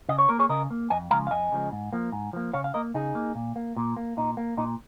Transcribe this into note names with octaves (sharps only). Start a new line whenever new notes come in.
C#3 D#5
C#5
A#3 A#4
G#4 C#5
C#3 A#4 D#5
A#3
F2 D#5 G#5
C#3 F3 G#3 F5 A#5
F5
F2 D#5 G#5
C#3 F3 G#3
G#2
F3 A#3
G#2
F3 A#3
C#3 C#5 F5
F5
A#3 A#4 D#5
C#3 D#4 G#4
A#3
A#2
A#3
A#2
A#3
A#2 D#4
A#3
A#2 D#4